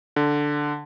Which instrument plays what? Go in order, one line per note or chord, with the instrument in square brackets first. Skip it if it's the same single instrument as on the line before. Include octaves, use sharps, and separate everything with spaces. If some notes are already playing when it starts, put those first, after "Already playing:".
[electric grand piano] D3